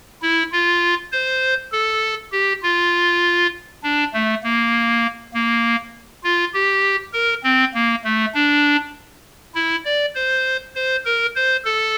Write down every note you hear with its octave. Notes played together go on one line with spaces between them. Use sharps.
E4
F4
C5
A4
G4
F4
D4
A3
A#3
A#3
F4
G4
A#4
C4
A#3
A3
D4
E4
D5
C5
C5
A#4
C5
A4